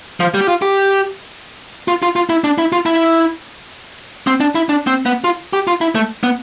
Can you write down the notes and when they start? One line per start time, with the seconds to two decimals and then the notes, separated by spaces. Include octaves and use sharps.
0.20 F3
0.34 G3
0.41 G4
0.48 F4
0.62 G4
1.88 F4
2.03 F4
2.16 F4
2.30 E4
2.44 D4
2.58 E4
2.73 F4
2.86 E4
4.27 C4
4.40 D4
4.55 E4
4.69 D4
4.87 C4
5.06 B3
5.24 F4
5.53 G4
5.67 F4
5.81 E4
5.95 A3
6.23 B3